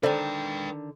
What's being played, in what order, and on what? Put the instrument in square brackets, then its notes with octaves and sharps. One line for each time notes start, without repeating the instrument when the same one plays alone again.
[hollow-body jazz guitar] D3 D#3 [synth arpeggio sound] A4 C5 D5 [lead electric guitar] B4 G5